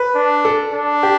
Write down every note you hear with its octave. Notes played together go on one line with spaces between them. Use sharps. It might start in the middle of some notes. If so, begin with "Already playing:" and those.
Already playing: B4
D4
A4
D4
G4